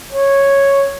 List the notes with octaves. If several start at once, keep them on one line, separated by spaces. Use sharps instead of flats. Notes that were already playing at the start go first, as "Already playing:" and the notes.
C#5